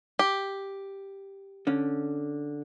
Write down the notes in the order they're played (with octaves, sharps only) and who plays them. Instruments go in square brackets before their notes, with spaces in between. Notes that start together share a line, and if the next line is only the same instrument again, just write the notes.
[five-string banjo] G4
[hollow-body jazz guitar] D3 C#4